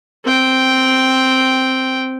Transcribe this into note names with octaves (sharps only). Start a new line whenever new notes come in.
C4 G5